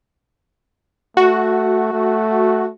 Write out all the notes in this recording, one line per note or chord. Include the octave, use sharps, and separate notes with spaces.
A3 F#4
A3